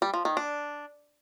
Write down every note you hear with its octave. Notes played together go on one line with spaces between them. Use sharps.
G3
F3
D#3
D4